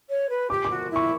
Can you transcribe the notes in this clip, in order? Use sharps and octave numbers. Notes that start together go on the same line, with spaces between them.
C#5
B4
G4 D6
F#4 D6
E4
C#6